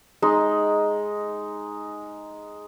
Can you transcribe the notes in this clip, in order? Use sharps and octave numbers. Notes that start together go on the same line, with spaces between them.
G#3 D#4